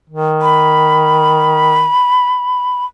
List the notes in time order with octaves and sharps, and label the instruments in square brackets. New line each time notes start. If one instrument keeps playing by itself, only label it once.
[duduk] D#3
[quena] B5